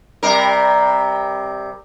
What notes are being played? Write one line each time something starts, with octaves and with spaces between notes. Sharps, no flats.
C3 G3 A#4